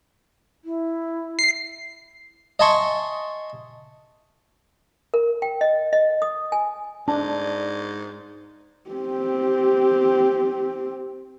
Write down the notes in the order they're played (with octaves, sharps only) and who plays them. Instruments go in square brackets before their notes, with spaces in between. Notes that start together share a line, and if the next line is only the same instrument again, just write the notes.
[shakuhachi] E4
[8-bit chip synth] C7
[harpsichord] D#5 E5 G#5 A5 C6 C#6
[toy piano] A#4
G5
D#5
D#5
D#6
G#5
[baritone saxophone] G#2 [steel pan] D4 [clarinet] D5 [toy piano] A5
[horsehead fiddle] C4 G4